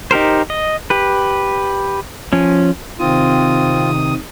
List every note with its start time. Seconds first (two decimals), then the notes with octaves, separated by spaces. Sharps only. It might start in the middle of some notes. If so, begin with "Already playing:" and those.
0.11 D#4 G4 A#4 C5
0.50 D#5
0.90 G4 B4
2.33 F3 C#4
3.00 C3 D#3 C4 F4 D#6